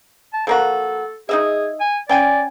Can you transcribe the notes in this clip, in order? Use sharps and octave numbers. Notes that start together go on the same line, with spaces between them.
A5
F3 A#3 F#4 A4
D#4 G#4 D#5 E5
G#5
C#4 D5 G5 G#5